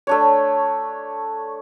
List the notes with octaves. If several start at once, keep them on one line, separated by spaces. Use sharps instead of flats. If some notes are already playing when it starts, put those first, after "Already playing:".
A3 D4 C#5